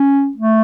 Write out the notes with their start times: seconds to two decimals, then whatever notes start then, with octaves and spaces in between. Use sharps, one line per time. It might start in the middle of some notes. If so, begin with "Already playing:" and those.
Already playing: C#4
0.37 A3